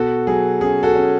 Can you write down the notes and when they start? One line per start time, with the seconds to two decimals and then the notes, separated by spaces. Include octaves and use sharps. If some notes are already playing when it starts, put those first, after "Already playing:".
Already playing: B2 F#4 A4
0.27 F#3 G#4
0.61 C#4 G#4
0.83 F#4 A4
0.95 C#4